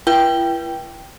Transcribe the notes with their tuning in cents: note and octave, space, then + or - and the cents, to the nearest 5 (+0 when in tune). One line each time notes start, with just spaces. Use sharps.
E4 +45 B4 -40 G5 +0